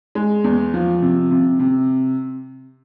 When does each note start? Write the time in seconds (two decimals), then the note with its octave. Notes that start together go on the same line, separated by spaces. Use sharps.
0.15 G#3
0.44 E2
0.74 F3
1.02 C3
1.31 C3
1.59 C3